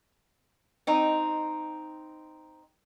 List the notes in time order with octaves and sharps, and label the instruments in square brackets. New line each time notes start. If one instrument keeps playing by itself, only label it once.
[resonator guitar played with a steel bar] C4 D#4